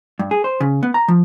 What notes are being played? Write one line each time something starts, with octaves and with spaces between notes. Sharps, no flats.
G2
G#4
C5
C#3
B3
A#5
F3